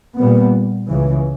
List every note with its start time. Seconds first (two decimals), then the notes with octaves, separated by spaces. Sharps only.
0.18 A#2 G3 B3
0.88 C#2 C#3 E3